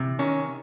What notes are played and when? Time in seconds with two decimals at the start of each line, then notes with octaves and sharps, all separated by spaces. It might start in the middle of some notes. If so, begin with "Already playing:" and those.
Already playing: C3 E3
0.19 D#3 C#4